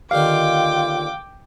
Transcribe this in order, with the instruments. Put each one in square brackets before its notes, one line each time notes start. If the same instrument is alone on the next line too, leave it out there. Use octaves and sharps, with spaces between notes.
[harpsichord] D#2 D3 D#3 [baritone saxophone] F4 [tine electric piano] F5 [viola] G5 D6